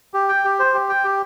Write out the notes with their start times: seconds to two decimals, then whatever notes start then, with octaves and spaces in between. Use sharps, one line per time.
0.14 G4
0.29 G5
0.45 G4
0.59 C5
0.74 G4
0.89 G5
1.04 G4